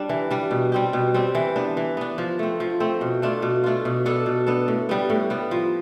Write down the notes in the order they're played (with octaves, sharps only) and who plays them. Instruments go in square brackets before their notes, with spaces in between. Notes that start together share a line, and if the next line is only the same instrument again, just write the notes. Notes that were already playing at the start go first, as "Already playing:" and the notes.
Already playing: [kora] G3 D4
E3
G3 D4
B2
G3 C4 G4
B2
G3 C4 G4
E3
B3 D4
E3
B3 D4
F3
A3 C4
F3
A3 C4
B2
A3 D4 F4
B2
A3 D4 F4
B2
B3 D4 A4
B2
B3 D4 A4
A2
G3 B3
A2
G3 B3
F3